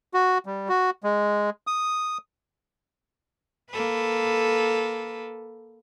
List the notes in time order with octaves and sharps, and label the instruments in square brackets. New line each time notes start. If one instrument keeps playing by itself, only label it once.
[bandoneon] F#4
G3
F#4
G#3
D#6
[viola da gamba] A#3 A4 B4